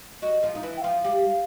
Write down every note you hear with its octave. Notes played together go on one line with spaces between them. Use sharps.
F#3 F#4 D#5
F3 F4
D#4
E3 E4
G5
F3 F4 F5
G3 G4